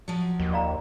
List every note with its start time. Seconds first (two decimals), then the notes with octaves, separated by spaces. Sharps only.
0.08 F3 F#3
0.40 D#2
0.52 D5 F5 A#5